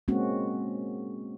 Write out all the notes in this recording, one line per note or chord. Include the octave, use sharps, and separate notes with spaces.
G#3 A#3 C4 C#4 F#4